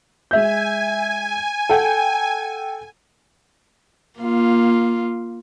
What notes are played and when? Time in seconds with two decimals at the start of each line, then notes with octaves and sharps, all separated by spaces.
0.31 G#3 E5 G#5 G6
1.69 A4 F#5 G5
4.19 A#3 F4